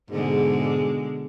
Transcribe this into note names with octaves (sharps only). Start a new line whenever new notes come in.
G#2 B2 D3 G#3